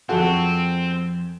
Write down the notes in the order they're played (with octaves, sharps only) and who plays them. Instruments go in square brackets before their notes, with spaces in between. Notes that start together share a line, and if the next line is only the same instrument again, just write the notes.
[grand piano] F2 G#4 [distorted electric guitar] C4 [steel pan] F#4 A4 F#5